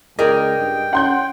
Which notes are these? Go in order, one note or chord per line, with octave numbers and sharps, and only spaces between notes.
C#2 G#4 A#4 D5 D#5 G5
G2
C#4 F#5 C6 G6